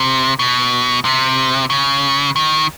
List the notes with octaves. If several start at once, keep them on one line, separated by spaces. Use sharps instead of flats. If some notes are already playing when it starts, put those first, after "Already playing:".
Already playing: C3
B2
C3
C#3
D#3